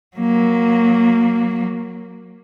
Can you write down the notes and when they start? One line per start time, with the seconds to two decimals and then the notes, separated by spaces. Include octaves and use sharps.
0.17 F#3 A#3